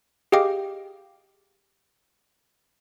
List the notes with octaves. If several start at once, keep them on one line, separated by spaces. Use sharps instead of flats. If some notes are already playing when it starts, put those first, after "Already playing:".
G4 G#4 D#5 F5 G5 D6